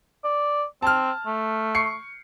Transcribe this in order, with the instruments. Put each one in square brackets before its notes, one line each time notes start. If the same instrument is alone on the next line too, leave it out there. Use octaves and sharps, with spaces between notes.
[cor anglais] D5
[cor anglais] C4 [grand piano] A5 F6
[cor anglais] A3
[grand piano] C#6 C7 C#7